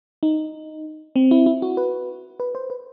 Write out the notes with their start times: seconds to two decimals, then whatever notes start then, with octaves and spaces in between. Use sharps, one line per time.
0.23 D#4
1.16 C4
1.31 E4
1.46 E4
1.62 F#4
1.77 B4
2.40 B4
2.55 C5
2.70 B4